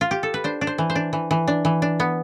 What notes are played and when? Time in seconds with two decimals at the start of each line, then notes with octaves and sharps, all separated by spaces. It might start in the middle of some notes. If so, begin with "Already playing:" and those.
0.01 F4
0.11 G4
0.23 A4
0.34 B4
0.44 D4 C5
0.61 D4
0.67 C5
0.78 E3
0.90 C5
0.95 D4
1.13 E3
1.31 E3
1.48 D4
1.65 E3
1.82 D4
2.00 B3